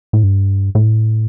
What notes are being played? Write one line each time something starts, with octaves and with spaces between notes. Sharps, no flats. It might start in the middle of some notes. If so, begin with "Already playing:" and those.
A2
G2
A2